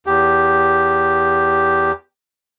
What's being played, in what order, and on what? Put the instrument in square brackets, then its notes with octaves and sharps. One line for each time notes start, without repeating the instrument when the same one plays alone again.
[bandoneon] E2 G4